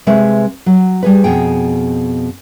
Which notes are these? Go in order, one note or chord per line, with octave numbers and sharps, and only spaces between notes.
C3 G#3 B4 E5
F#3
G3 G#4 B4
F2 B2 G#4 G5